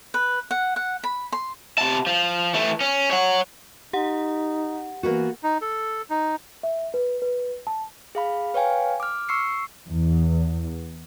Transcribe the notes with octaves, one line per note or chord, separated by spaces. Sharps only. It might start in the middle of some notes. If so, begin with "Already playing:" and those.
B4
F#5
F#5
B5
C6
C3 A5
F3
E3 A3
C#4
C#5 F#5
D#4 G4 F#5
E3 A#3 B3 F#4
D#4
A4
D#4
E5
B4
B4
A5
G#4 F5 B5
B4 C#5 F5 G5 G#5
D6 F6
C#6 E6 C7 C#7
E2